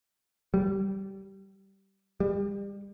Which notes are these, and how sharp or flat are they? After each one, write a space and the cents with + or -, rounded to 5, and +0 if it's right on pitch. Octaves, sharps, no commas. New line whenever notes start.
G3 -15
G3 +30